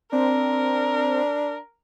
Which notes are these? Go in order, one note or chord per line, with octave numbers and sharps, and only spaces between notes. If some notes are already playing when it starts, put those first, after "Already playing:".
C4 D4 A#4